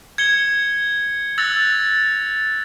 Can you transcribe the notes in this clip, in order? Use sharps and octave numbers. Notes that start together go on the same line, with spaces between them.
G#6 C#7 G7
E6 F#6 A6 A#6 F7